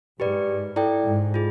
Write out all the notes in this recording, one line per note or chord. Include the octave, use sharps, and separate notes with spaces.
G#2 G4 B4 D5
E4 A4 D5 G5
G#2
F4 G#4